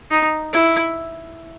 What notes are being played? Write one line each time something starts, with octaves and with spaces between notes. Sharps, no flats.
D#4
E4